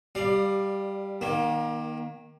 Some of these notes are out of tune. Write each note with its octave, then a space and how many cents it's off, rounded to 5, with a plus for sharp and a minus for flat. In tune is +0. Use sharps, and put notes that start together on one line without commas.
G3 +0 D5 +25 F5 +5
D#3 +0 A#3 +30